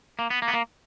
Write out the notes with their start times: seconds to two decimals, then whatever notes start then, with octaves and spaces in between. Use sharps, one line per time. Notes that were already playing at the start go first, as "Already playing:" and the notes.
0.19 A#3
0.30 B3
0.42 A#3
0.48 B3
0.54 A#3